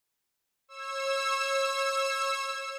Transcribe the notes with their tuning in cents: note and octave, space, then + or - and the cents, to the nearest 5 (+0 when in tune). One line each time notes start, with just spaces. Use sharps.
C#5 -30 E6 +0